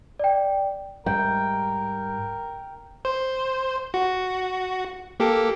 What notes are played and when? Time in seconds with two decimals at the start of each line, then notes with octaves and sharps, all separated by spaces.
0.20 D5 G5
1.06 G#2 G3 A#4 G5
3.05 C5
3.94 F#4
5.20 A#3 G4 A4